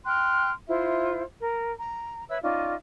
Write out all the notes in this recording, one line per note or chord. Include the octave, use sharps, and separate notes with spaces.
G5 C6 F6 F#6
E4 F4 C5 E5
A#4
A#5
B4 C#5 E5 E6
C#4 D#4 F4 D5